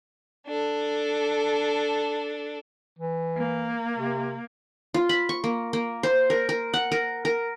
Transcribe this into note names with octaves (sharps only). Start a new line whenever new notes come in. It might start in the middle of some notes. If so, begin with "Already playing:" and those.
D4 A4
E3
A#3
C3
F4
B5
C#6
A#3
A#3
C5
A#4
A#4
F#5
A#4
A#4